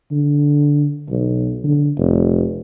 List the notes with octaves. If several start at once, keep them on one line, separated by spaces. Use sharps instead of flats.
D3
B1
D3
F1